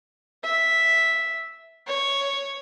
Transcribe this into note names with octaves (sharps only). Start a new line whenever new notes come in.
E5
C#5